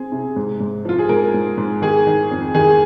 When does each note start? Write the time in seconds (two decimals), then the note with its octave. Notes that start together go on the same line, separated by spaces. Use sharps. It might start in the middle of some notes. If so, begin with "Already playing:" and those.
Already playing: C4 G#4
0.12 C3
0.36 G#2
0.60 G#2
0.85 F3 F4
0.99 G#4
1.09 G#2 A#4
1.34 G#2
1.57 G#2
1.82 D#3 G#4
2.07 D#3
2.31 F2
2.54 D#3 G#4